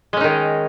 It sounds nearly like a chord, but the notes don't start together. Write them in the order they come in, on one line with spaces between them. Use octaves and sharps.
G#3 C#4 D#4 D#3